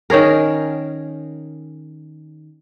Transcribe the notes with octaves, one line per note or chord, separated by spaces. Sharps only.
D#3 C#4 G#4 A#4